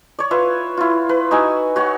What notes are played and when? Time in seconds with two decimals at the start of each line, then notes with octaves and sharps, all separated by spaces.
0.19 C#5 D5
0.31 F4 B4 E5
0.77 E4 F4
1.09 B4
1.31 D#4 F#4 G#5 E6
1.76 F#4 C#5 F#5